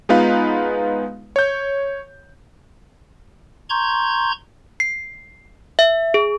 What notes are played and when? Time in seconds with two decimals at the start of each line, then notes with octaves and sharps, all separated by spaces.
0.09 G#3 B3 D#4 F4 B4 F5
1.36 C#5 G6
3.69 A#5 C6 C#6 G6 G#6
4.80 C7
5.79 E5
6.14 G#4